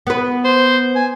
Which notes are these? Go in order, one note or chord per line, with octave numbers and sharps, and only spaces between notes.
B3 B4
C5
G#5